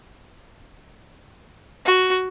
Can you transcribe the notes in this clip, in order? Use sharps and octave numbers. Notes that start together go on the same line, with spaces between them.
F#4